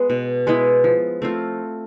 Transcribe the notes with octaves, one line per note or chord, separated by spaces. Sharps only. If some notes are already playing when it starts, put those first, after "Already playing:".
Already playing: G#3 B3
B2
G#3 B3 E4
F3
A3 C4 F4